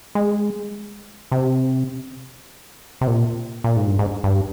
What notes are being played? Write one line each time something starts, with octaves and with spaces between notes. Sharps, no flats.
G#3
C3
C3
A#2
A#2
G#2
G2
G#2
G2